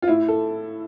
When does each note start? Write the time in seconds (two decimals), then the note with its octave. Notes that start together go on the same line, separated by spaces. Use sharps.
0.02 F4
0.08 A2 E4
0.28 A4